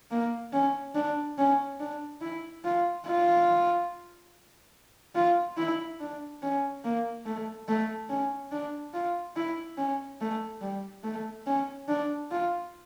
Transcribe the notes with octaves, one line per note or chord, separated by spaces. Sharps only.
A#3
C#4
D4
C#4
D4
E4
F4
F4
F4
E4
D4
C#4
A#3
A3
A3
C#4
D4
F4
E4
C#4
A3
G3
A3
C#4
D4
F4